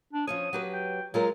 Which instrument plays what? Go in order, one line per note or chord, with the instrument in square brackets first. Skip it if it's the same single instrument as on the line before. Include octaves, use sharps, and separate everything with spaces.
[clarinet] D4
[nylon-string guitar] F3 C#4 C#5 [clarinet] D#6
[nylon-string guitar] F#3 G4 B4
[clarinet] G5
[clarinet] F#3 [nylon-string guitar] G#3 F4 A#4